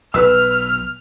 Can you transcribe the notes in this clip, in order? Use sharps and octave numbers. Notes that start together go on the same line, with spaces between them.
B1 B4 E6 F6